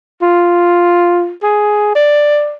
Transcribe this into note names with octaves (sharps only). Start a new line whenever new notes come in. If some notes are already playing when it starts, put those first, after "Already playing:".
F4
G#4
D5